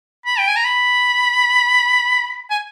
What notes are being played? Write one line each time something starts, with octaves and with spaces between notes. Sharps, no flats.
B5
G5
G#5
A#5
B5
G#5